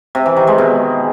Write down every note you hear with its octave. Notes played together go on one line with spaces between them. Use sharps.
C3
E3
D#3
G#3
B2